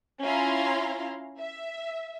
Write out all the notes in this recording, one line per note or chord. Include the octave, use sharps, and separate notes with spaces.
C#4 E4 F4 F5 A#5 C6
E5